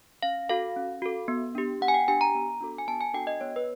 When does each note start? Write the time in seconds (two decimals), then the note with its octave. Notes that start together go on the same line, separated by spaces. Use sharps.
0.23 C#4 F5
0.49 F#4 A4 F5
0.76 C#4
1.02 F#4 A4
1.28 B3
1.55 D4 G4
1.81 B3 F#5
1.88 G#5
1.94 G5
2.08 D4 G4 G#5
2.21 A#5
2.35 B3
2.61 D4 F#4 A4
2.78 G#5
2.88 B3 A5
3.01 G#5
3.14 D4 F#4 A4 G5
3.27 D#5
3.41 B3 C#5
3.56 B4